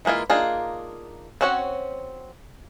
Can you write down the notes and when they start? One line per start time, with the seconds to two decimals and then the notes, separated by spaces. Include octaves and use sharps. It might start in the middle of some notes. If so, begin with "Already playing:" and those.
0.05 E3 G#3 A#3 E4 F4
0.30 A#3 D4 D#4 F4 G#4
1.41 C4 C#4 F#4 C#5 F#5